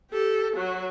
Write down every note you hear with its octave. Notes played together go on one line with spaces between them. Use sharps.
G4 A4
F#3 F#4